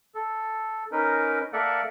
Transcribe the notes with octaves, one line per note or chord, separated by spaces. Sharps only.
A4
C#4 D#4 A#4 B4
A#3 A4 A#4 D5 E5 F#5